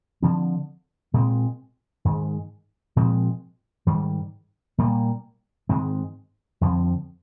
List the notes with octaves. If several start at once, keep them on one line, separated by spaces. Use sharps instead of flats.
D3 F3 C4
A#2 G#3 C4
G#2 D#3 G#3
A#2 F3 G#3 C4
G#2 D#3 G3
A#2 G3 A#3
G#2 D#3 G#3 C4
F2 D3 F3 C4